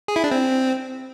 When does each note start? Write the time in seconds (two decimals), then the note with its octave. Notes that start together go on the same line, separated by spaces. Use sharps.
0.08 G#4
0.16 E4
0.24 D4
0.31 C4